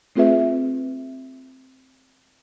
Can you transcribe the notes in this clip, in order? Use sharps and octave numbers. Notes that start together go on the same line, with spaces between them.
A3 C4 F4 G#4 B4 E5